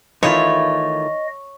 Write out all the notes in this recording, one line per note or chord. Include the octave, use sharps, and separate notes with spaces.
D#3 E3 A3 D#4 F4 C#5 D#5